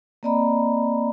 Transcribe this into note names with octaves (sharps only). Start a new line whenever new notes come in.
A#3 C4 D5 D#5 A#5 B5